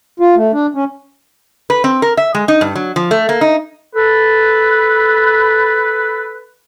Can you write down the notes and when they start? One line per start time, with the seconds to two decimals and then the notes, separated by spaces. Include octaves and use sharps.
0.20 F4
0.36 A3
0.53 D4
0.75 C#4
1.70 B4
1.84 C4
2.02 A#4
2.17 E5
2.35 G#3
2.48 D#4
2.61 G2
2.75 F#3
2.96 F3
3.11 A3
3.29 A#3
3.41 D#4
3.96 A4 B4